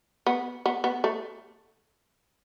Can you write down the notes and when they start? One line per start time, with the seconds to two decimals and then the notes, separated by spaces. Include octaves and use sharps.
0.27 B3
0.66 B3
0.84 B3
1.04 A3